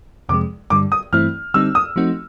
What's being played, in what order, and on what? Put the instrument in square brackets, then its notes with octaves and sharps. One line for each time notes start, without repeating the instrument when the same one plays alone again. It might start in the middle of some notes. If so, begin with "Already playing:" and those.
[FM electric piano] F2 C3 F3 G#3 [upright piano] D6
[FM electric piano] G2 D3 G3 [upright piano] D6
[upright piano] D#6
[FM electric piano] G2 E3 A3 C4 E4 [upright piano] F6
[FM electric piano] D3 G3 C4 D#4 [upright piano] E6
[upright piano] D#6
[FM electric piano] F3 A3 C4 D#4 F#4